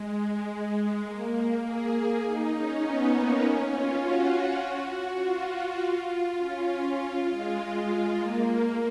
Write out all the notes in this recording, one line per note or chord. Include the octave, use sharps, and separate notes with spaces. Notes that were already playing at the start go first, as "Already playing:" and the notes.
Already playing: G#3
G#3
A#3
G#4
D#4
C#4
B3
A#3
C#4
F4
F#4
F4
F#4
F4
C#4
F4
G#3
G#3
A#3